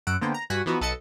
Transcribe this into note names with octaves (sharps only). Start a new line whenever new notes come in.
F#2 F#5 E6 D7
D3 A#3 B3 C5 G5
A#5
G2 G3 F#4 F#5 G#5 B6
E3 F3 B3 D#4 F#4
B1 A4 B4 D#5 A6 C#7